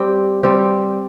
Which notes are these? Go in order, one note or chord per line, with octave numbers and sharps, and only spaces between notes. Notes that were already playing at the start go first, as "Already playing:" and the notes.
Already playing: G3 C4 G4
G3 C4 G4